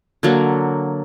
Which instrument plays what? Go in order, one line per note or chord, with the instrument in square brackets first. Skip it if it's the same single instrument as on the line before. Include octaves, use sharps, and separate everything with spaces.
[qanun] D3 F#3 A#3